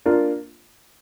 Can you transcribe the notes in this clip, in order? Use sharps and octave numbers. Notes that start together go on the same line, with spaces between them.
A#3 D4 F4